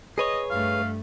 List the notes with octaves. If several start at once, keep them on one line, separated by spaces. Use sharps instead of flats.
G#4 B4 C#5 D#5
G2 A3 F5